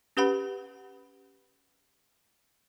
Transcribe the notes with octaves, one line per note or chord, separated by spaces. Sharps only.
C#4 G4 B4 F#5 B5